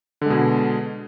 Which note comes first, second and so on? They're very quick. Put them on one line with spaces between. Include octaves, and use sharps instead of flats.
D3 G#3 B2